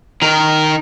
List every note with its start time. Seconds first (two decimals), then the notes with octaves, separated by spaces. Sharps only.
0.22 D#3 A#4